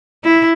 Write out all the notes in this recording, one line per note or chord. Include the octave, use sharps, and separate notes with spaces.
E4